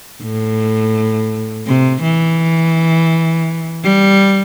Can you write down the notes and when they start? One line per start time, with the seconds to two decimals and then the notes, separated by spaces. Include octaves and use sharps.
0.22 A2
1.66 C3
2.03 E3
3.84 G3